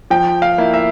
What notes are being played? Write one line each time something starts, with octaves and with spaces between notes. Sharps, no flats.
F3 G5
F5
A#3 E4
E5